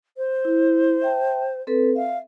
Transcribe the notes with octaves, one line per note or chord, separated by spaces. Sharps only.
C5
E4
E5 G5 A5
C4 A4 B4
E5 F5